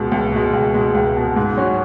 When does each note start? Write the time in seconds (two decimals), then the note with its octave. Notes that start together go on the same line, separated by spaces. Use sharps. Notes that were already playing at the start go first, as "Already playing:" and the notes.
Already playing: C#2 B2 G#3
0.12 C#2
0.32 B2 G#3
0.53 C#2
0.74 B2 G#3
0.95 C#2
1.16 B2 G#3
1.36 G#2
1.57 F#3 C#4 F#4